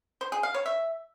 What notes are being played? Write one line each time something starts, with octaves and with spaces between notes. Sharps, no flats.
C5
G#4
F5
C#5
E5